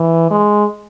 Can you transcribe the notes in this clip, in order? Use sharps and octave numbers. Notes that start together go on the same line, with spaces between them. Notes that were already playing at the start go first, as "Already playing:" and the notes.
Already playing: E3
G#3